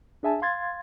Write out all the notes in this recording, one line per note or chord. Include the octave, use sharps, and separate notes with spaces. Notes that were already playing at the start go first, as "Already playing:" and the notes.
D4 G#4 E5 G#5 A5
F5 C6 G#6 A6